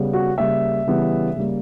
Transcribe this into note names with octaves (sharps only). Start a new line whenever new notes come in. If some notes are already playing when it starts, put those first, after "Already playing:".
Already playing: C#3 G3 B3
F#4
C#3 G3 A#3 E5
C#3 E3 G3 B3
C#3 G3 A#3